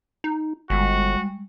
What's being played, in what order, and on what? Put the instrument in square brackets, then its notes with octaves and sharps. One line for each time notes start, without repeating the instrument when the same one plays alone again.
[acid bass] D#4
[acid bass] G1 [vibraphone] G3 G#3 [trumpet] F#4